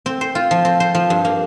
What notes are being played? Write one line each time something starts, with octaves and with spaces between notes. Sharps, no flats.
C4
C5
F4
F3
C4
C5
F3
G2
A#3